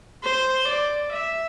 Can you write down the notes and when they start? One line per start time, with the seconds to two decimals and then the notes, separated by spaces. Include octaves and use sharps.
0.23 C5
0.68 D5
1.13 E5